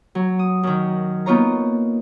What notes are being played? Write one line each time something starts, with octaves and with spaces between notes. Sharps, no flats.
F#3
D#6
F#2 D#3
A#3 B3 D#4 F4 C#5 A#5